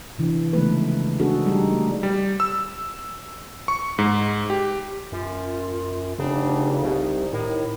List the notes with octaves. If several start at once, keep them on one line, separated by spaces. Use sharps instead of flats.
C3 E3 D4
C#3 F3 G#3 A3 D#4 B4
C4 D4 D#4 F#4 G#4 A4
G3 D#4 G4
A3
G3
E6
C#6
G#2
G4
F#2 F4
F1 C#3 D4
C2 C3 D#4
A2 D#3